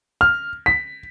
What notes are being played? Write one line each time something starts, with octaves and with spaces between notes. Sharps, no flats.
F6
B6